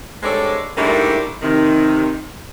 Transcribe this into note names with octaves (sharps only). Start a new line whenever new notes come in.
G2 G#3 C4 A4 C#5 D5
G#2 G3 A3 A#3 D4 E4
C3 D#3